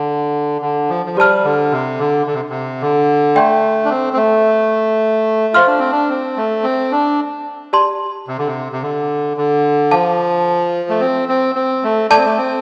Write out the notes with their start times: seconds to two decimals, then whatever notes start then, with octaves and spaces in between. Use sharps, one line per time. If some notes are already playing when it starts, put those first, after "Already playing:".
Already playing: D3
0.61 D3
0.89 F3
1.06 F3
1.17 G3 G4 C5 A5 F6
1.44 D3
1.71 C3
1.99 D3
2.27 D3
2.33 C3
2.49 C3
2.81 D3
3.35 A3 D5 G5 C6 G6
3.85 D4
3.90 C4
4.13 C4
4.17 A3
5.54 F4 C5 F5 C6 F6
5.67 D4
5.79 C4
5.92 D4
6.10 C4
6.37 A3
6.63 C4
6.92 D4
7.73 G4 D5 A5 C6
8.27 C3
8.38 D3
8.47 C3
8.72 C3
8.82 D3
9.37 D3
9.91 F3 F5 A5 D6
10.89 A3
11.01 C4
11.29 C4
11.55 C4
11.84 A3
12.10 A3 A4 D5 A5 D6 G6
12.18 C4
12.25 A3
12.38 C4